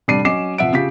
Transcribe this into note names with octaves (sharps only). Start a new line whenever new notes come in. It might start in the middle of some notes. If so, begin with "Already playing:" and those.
F1 G3 D4 D5 C7 D#7
F#3 C#4 D#5 D6 C7 E7
F1 F3 E5 F#5 D7
C#3 F4 G4 F5 B6